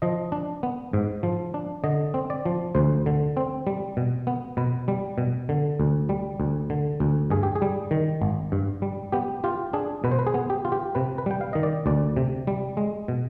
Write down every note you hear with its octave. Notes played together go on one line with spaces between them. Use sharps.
F3 D#5
D4
B3
G#2
F3
D4
D3 D#5
C4
D5
F3
D2 C5
D3
C4
G3
B2
B3
B2 B4
G3
B2
D3
D2
G3
D2
D3
D2
G2 G#4
G4
G#4
G3
D#3
G#1
G2
G3
B3 G4
F4 G4
D4 G#4
B2 B4
C5
B4
G#4
B3
G4
F4
G4
C3 B4
B4
G3 G5
F5
D#3 D#5
D5
D2 D5
C3
G3
G#3
B2